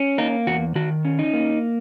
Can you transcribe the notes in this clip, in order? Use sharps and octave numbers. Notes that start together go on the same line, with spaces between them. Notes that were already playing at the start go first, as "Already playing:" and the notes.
Already playing: C#4
A#3 D#4
E2 F#4
D#3 F#4
C#4
D#4
A#3